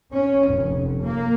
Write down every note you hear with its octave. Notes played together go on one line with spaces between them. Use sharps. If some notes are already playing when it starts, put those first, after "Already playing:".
C#4
F1
A#3